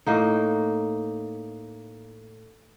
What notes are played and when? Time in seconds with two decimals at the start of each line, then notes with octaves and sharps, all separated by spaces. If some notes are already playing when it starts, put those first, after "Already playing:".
0.06 A2 A#3 D#4